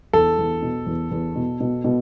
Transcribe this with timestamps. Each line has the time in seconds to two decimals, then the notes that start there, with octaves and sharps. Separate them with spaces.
0.13 E2 A4
0.39 E2
0.62 B2
0.86 E2
1.11 E2
1.35 B2
1.60 B2
1.84 B2